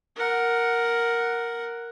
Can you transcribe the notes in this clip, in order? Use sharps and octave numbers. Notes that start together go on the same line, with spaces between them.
A#4 F#5